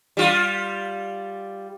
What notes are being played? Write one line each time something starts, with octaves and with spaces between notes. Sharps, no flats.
G3 F4